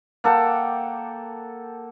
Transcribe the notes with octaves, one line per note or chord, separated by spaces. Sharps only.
A#3 A4 F#5 G5